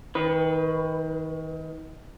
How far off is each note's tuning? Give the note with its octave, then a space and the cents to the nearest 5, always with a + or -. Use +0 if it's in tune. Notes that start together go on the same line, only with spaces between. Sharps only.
D#3 +30 B4 +0